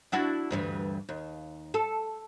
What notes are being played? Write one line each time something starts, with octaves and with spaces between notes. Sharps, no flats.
D4 E4 F#4
D2 G2 E3
D#2
A4